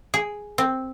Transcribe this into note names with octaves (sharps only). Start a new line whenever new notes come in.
G#4
C4